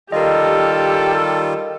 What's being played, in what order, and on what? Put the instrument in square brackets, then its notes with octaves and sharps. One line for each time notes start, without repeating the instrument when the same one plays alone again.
[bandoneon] D#3 G3 F4 [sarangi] G4 [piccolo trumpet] A4 [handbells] A#4 D#5